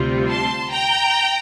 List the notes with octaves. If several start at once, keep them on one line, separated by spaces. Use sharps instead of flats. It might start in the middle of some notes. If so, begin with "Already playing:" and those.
Already playing: D2 C3 G3 C4 F4
A5 C6
G5 A#5